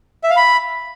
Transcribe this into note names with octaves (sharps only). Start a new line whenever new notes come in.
E5
F5
B5